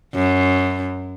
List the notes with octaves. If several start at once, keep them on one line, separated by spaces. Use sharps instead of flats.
F#2